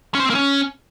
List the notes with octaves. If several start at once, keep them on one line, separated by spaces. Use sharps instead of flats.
C#4
C5
C4
A#3
C#4